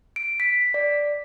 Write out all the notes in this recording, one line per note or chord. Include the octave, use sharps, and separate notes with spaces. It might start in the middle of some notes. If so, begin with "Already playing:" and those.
D7
B6
D5